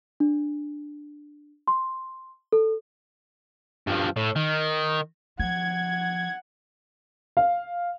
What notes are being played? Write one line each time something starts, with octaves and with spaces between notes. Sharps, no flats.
D4
C6
A4
G2 F3
A2
D#3
F3 F#5 G#6
F5